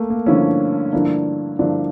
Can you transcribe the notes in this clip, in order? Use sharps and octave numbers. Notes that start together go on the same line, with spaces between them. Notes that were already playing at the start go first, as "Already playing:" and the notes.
Already playing: A3 A#3
A#3
G2 D3 F3 A#3 C#4 E4
G2 D3 F3 A#3 D4 E4
G2 D3 F3 A#3 D4 E4